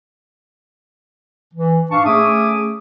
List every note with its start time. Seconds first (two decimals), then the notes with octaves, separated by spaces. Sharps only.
1.54 E3
1.91 G#2 D4 F5 A5 C#6
2.05 A3 C#4 G#4 E5 D6 D#6